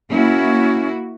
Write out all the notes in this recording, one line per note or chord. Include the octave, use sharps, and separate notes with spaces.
A#3 C#4 E4 F#4